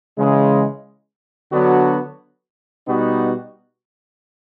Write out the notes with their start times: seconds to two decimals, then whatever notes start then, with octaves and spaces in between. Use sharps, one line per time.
0.18 C#3 E3 G#3
1.52 D3 F#3 B3 D4 F#4
2.87 B2 G3 B3 D#4 F#4